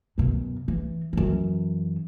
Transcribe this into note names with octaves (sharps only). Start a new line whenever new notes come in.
F#2 B2
E3
F#2 E3